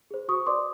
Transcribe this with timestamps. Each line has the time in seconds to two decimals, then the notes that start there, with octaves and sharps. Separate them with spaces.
0.11 G#4 C5
0.28 F#4 C#6 D#6
0.46 B4 D5 C6 D6